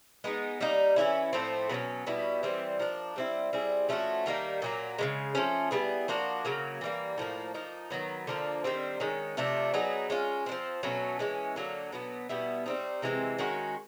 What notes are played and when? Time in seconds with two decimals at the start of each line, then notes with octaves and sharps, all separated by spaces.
0.24 G#3 B3 D#4
0.61 G3 A#3 D#4
0.96 E3 G#3 C#4 E4
1.33 A2 F3 A3 C4
1.69 B2 F#3 A#3 C#4
2.07 B2 G3 B3 E4
2.43 E3 G3 C4
2.79 F3 A#3 D4
3.16 G3 C4 E4
3.53 G3 C4 E4 G#4
3.89 F3 A3 C#4 F#4
4.26 D#3 G3 A#3 D#4
4.62 A#2 F#3 A#3
4.98 C#3 E3 G#3
5.35 F3 A3 C#4
5.71 G3 B3 E4 G#4
6.08 F3 A#3 D4 F#4
6.45 C#3 F#3 A#3
6.81 E3 G3 A#3
7.18 A2 F3 A#3
7.54 F3 A#3 D#4
7.90 D#3 F#3 B3
8.27 D3 F3 A#3
8.64 D#3 G3 C4
9.00 D#3 G#3 C#4
9.37 C3 F3 A3 D4
9.74 F#3 B3 D#4 G#4
10.10 G#3 C#4 F4
10.46 G#3 C4
10.52 F3
10.83 B2 F#3 A3 C#4
11.19 E3 G#3 C#4
11.56 D3 F#3 A#3
11.92 B2 F#3 B3
12.29 B2 G3 B3 E4
12.66 G3 C4 D#4
13.02 C3 E3 G#3 C4
13.38 D#3 G#3 C#4 F#4